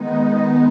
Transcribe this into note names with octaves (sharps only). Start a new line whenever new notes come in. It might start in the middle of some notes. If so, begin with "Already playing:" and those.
Already playing: D#3 G#3 B3 D#4